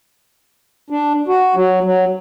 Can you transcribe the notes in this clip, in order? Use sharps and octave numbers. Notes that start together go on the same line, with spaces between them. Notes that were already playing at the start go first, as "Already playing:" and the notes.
D4
F#4
F#3
F#3